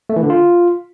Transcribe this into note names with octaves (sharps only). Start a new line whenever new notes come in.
A3
E3
D3
F4